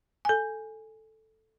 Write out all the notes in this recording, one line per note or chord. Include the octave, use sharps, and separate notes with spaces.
A4 G#5